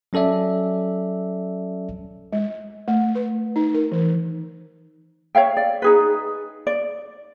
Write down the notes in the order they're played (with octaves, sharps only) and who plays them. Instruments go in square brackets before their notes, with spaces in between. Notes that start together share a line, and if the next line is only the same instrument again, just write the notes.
[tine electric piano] F#3 C#4 A4 D5 E5
[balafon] G#3
A3
B4
D#4
A#4
E3
[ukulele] C#5 E5 F5 G5
D5
D#4 G#4 B4
D5